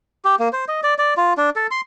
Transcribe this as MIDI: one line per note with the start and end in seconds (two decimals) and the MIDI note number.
0.25 0.35 67
0.39 0.48 58
0.53 0.65 72
0.68 0.81 75
0.83 0.94 74
0.98 1.14 74
1.17 1.33 65
1.37 1.50 62
1.56 1.67 69
1.71 1.81 84